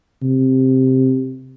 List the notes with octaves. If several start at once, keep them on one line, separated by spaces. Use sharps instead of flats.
C3